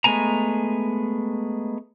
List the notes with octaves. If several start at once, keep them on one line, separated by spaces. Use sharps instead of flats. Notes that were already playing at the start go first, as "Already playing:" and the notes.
G#3 A3 B3 G#5 A#5